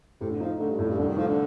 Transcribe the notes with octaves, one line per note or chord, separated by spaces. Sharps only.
A2 C3
D3
F3 D#4
D3 A3
G2
F2 A2
G2
C2 D3
D#3
F3 A3
D3